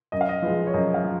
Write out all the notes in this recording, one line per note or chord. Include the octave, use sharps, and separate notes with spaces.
F#2 D#5
F5
D#5
F3 G#3 B4
C#5
F#2 D#5
F5
F3